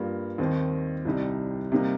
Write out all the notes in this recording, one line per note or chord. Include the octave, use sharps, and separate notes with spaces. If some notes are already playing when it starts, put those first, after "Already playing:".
Already playing: G2 G3 A#3 F4
D#2 D#3 C4
C2 C3 G3 D#4
C3 G3 A#3 D#4